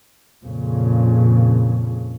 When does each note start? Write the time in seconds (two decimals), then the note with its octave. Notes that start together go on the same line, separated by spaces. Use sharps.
0.45 F2 A#2 C#3